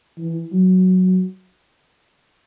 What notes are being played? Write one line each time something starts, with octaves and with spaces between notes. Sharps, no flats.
E3
F#3